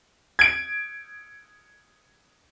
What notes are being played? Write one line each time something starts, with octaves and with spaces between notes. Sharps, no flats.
G#6 D7